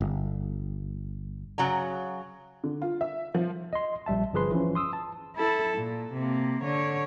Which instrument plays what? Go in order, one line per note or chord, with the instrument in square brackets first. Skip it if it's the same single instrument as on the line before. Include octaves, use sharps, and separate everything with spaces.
[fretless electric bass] G1
[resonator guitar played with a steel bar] C#3 F#3 F#5 A#5
[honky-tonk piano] D3
F4
E5
F3
[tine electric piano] D#5 C6
A#1 G3 E5 A5
G1 F3 G#4 B4 C6
E3 F3 C#4
C6 D#6 E6
A5
[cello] E4 A4
A#2
C3 A#3
D3 C#5